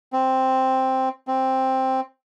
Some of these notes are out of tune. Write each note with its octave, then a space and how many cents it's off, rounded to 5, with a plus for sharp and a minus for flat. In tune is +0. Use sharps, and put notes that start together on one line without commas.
C4 +0
C4 +5